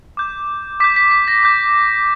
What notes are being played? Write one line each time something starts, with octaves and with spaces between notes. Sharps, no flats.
D6 G6
D6 G6 B6
B6
B6
A#6
D6 G6